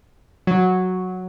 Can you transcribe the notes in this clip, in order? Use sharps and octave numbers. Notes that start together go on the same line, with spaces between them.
F#3